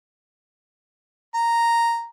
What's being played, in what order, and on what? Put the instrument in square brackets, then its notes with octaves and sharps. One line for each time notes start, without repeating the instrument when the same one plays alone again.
[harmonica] A#5